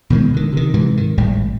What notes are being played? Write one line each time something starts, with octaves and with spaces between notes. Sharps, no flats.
B2 D#3 F3 G#3
D3 D#3
C3 D#3
G#2 C3 E3
D#3
G#1 A2 G3